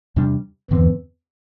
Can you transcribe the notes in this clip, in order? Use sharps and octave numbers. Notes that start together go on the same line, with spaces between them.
E2 C3 G3 D4
E2 G2 D3 E3 C4